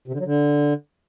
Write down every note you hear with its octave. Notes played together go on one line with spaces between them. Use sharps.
C3
D3
F#3
D3